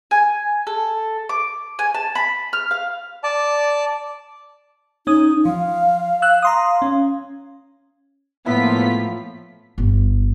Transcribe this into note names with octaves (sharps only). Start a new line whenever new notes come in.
G#5
A4
D6
G#5
A5
B5
F6
F5
D5 A5
C#4 D#4 D#6
F3 F5
E6 F#6
F5 A#5 C6 D#6
C#4
A2 F3 A#3 B3 E4 F4 B6
G1